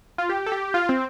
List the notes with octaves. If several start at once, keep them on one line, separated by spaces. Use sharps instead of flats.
F4
G4
A4
G4
F4
C4